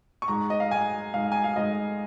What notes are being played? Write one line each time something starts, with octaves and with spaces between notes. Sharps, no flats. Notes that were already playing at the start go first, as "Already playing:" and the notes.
C#6
G#2 A#5
D#5
F5
G#2 G#5
G#2 F5
G#5
F5
G#2 D#5